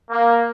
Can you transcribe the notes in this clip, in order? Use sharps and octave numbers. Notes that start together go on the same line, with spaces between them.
A#3